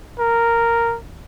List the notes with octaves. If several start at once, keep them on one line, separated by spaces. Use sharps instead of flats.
A#4